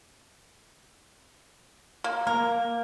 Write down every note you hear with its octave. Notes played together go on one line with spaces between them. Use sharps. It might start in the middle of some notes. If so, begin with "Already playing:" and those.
A#3
A#3 A#4